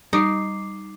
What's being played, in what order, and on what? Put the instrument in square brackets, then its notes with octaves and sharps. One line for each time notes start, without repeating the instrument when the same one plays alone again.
[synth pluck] G3 D6 C7 [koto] D#4